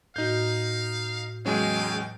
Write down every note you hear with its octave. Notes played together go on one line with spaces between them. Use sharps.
A2 D#4 F#4 F5 G6
E2 F#3 G#3 C#4 F5 G5